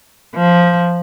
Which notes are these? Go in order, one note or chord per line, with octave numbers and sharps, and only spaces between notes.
F3